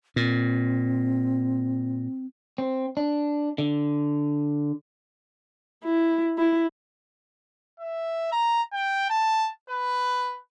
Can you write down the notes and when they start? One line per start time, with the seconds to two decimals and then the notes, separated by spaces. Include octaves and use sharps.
0.16 A#2 C4
2.58 C4
2.97 D4
3.58 D3
5.84 E4
6.38 E4
7.80 E5
8.32 A#5
8.73 G5
9.10 A5
9.70 B4